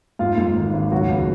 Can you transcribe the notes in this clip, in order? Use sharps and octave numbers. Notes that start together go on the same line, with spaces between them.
G#2 F4 F5
G#2
G#1
G#1
C#2 F#3 F#4
C#2